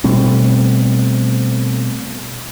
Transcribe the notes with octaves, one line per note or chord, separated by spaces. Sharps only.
B2 G3 A3 C4